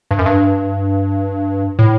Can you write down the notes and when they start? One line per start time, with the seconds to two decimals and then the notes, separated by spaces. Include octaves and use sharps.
0.11 G2
0.19 F#2
0.26 G2
1.79 A2